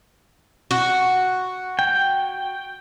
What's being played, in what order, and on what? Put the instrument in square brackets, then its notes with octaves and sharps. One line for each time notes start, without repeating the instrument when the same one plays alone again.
[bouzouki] F#4
[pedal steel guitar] G5